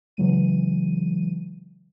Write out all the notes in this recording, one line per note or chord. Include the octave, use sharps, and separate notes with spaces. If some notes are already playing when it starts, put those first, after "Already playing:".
C#3 E3 F#3 G#3 D#7